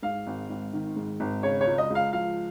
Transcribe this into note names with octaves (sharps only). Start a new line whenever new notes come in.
G#2 F5
G#1
G#1
D#3
G#2
G#1
C#3 C#5
C#5
C#2
D#5
C#2 F5
F3 F5